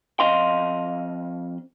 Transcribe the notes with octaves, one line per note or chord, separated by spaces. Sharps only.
F2 D#5 F5 C6